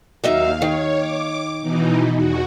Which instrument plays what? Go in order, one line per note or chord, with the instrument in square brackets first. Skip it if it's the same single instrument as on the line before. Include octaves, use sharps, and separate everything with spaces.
[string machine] D#2 F5 [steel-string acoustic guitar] F#3 D#4 E5
[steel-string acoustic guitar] D#3 [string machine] C#5
[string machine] D6
B2 E3 D#4
E2 F#4